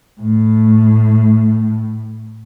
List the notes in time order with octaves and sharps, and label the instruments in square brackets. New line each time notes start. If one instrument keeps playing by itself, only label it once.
[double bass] A2 A3